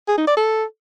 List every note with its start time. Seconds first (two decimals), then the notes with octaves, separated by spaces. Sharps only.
0.08 G#4
0.18 D#4
0.27 D5
0.37 A4